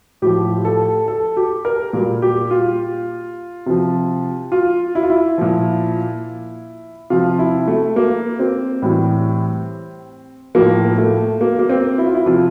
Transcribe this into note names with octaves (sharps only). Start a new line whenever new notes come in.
A2 F3 G4
A4
A4
G4
A#4
A#2 G3
G4
F4
C3 F3
F4
E4
F4
E4
A#2 F3
C3 F3 F4
E4
A3
A#3
C4
A2 E3 G3
A2 F3 A#3
A3
A#3
A#3
C4
E4
F4
E4
C3 F3 F4